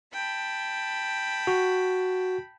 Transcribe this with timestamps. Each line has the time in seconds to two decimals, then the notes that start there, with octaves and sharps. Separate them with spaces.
0.13 G5 A5 B5
1.47 F#4